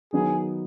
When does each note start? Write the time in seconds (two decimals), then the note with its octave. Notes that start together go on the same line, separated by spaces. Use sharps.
0.13 D#3 F#3 B3 D#4 G#4